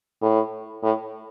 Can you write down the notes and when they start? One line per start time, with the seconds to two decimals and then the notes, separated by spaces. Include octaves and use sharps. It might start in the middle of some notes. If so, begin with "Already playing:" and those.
0.22 A2
0.83 A2